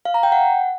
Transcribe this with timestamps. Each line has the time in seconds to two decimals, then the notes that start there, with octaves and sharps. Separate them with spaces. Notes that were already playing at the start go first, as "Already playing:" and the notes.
0.05 F5
0.14 A#5
0.23 G5
0.32 F#5